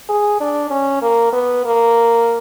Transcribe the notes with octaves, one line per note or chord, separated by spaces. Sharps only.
G#4
D4
C#4
A#3
B3
A#3